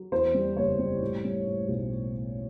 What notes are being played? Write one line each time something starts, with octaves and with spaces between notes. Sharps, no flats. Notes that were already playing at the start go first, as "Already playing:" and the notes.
Already playing: F#3
E2 C5
G3
F#1 C#5
G3
A2
G3
A2
B1